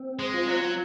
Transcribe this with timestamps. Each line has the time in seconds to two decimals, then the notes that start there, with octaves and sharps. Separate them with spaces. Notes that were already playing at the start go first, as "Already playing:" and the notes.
Already playing: C4
0.19 G#3
0.34 F4
0.48 F#3